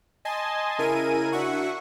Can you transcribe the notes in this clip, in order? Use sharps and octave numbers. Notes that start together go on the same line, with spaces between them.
D#5 G#5 A5 C6
C#3 E4 A#4 G#5 D#7
D4 F#4 E5 F#5 C#6